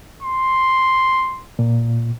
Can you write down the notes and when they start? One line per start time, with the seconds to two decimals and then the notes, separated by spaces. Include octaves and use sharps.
0.23 C6
1.59 A#2